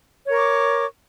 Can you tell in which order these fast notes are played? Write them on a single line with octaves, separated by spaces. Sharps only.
C#5 A#4 C#6 D6